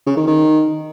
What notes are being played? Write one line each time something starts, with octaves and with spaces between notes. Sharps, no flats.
C#3
D#3
D#3